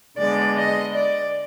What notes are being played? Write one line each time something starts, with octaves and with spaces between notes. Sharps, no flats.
D3 G#3 B3 D5
D#5
D5